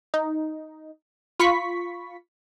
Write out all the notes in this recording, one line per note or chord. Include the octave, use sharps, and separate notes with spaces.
D#4
F4 B5 C#6 B6